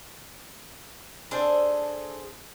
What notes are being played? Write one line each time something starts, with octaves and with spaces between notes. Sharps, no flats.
D4 G#4 A4 C5